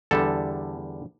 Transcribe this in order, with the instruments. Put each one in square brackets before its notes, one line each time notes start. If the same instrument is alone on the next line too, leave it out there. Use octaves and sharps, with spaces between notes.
[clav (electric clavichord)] E2 D3 G3 A4